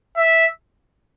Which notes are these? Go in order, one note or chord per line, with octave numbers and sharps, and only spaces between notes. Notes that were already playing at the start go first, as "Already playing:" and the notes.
E5